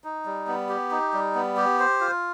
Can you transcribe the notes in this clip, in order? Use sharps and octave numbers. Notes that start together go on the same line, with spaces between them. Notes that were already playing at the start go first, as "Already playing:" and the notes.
D#4
G3
B3
G4
D#4
G3
B3
G4
C5
F4